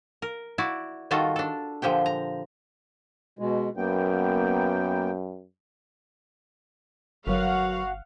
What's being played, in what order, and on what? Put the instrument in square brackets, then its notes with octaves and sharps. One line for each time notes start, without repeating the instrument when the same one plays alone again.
[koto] A#4
E4 F#4 D5
D#3 G3 F4 F#4 A4
D4 A4
A#2 D3 F3 G4 G5
A#5
[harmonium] B2 G#3
[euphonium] F#2 [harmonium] A#3 B3 G5
[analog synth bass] G1 [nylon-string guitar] F#3 A#4 B4 [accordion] F#4 [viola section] F5 F#5